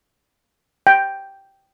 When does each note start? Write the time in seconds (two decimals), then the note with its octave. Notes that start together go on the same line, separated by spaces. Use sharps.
0.87 G5